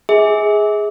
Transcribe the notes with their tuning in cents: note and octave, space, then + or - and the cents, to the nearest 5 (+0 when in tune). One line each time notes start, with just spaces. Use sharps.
G#4 +0 E5 -40